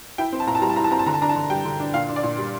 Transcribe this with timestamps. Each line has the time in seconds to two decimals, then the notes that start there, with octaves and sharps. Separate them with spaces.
0.18 E4 G5
0.33 C4
0.40 A5
0.47 A#2 A#5
0.55 A5
0.62 G3 A#5
0.69 A5
0.76 E4 A#5
0.84 A5
0.91 C4 A#5
0.99 A5
1.06 D3 A#5
1.14 A5
1.21 D4 A#5
1.29 A5
1.36 D3
1.50 G3 G5
1.65 D3
1.80 D4
1.94 A#2 F5
2.09 D4
2.16 D5
2.23 A#2
2.38 G3